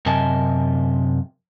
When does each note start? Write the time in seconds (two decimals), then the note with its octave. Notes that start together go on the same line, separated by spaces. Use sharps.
0.06 F#2 C3 A#4 D#5 G#5 A5